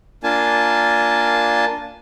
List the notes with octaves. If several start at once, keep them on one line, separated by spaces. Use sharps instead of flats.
A#3 D4 F4 G#5 A5